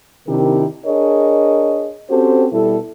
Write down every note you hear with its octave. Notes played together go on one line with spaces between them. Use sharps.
C3 D#3 D4 E4 G4 A#4
D4 G#4 A#4 C#5 D#5
C4 C#4 F#4 G4 A4 C5
B2 G3 E4 A4